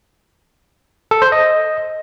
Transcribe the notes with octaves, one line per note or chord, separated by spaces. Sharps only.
A4
C5
D#5